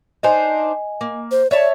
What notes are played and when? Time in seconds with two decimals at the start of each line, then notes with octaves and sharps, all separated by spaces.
0.23 D4 D#4 C5 D#5 G#5
1.01 A#3
1.31 C5
1.51 C#5 D5 E5 A5